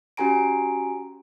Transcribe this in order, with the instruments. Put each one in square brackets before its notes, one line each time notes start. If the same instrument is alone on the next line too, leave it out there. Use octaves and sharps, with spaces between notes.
[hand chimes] C#4 F#4 G4 G#5 A#5 D7